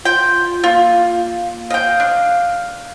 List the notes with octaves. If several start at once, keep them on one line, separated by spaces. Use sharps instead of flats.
F4 G5
A#3 F4
D#5 F5 G5
D4